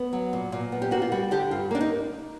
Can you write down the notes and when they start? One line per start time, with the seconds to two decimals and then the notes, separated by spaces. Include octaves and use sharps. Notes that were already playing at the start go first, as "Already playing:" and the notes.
Already playing: B3
0.13 F#3
0.33 A#2
0.52 A#2
0.72 B3
0.82 G4
0.91 A#3 F#4
1.02 F4
1.12 G3 F#4
1.31 D3 G4
1.51 G2 F4
1.71 A#3 D4
1.81 D#4